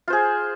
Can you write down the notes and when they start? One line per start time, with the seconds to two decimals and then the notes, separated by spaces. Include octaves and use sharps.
0.08 F4
0.10 C5
0.13 G#4